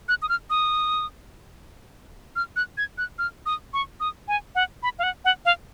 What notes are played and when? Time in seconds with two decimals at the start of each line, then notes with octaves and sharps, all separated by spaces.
0.08 F#6
0.22 D#6
0.29 F6
0.50 D#6
2.36 F6
2.56 F#6
2.78 G#6
2.98 F#6
3.19 F6
3.46 D#6
3.73 C#6
4.00 D#6
4.28 G#5
4.55 F#5
4.83 B5
4.99 F5
5.03 F#5
5.25 F#5
5.45 F5